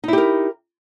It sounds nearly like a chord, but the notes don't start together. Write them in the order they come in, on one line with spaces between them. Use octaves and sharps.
D#4 E4 G4 A#4